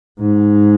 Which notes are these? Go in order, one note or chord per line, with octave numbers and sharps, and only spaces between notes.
G#2